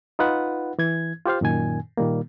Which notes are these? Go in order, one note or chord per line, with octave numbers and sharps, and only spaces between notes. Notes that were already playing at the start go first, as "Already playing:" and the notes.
D#4 F4 B4 F#5
E3 G#6
F4 G4 C5 F5
F#2 A#2 D#3 G#5
A#2 D#3 G3 A#3